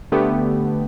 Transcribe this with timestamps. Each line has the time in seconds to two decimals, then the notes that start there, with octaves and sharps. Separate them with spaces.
0.12 D3 A3 B3 G4